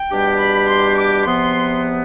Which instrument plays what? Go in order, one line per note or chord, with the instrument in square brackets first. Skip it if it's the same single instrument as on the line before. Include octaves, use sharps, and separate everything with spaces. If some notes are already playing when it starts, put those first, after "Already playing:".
Already playing: [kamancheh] G5
[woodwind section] E2 B2 G3 D4 G4
[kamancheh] B5
C6
D6
[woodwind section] E2 C3 F3 B3 [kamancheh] C6